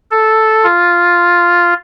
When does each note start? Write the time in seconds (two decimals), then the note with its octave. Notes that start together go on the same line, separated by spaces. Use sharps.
0.11 A4
0.64 F4